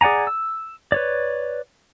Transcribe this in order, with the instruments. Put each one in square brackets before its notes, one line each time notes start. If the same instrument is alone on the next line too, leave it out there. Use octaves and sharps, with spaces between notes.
[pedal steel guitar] G#4 D5 F#5 G#5 A#5
E6
B4 C#5 D5